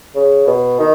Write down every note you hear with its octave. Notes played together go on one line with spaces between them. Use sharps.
C#3
B2
D#3